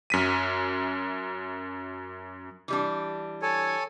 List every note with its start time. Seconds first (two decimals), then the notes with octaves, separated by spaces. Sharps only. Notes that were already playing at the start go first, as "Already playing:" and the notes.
0.10 F#2 B6 D#7
2.68 E3 G3 D4
3.42 A4 C#5 G#5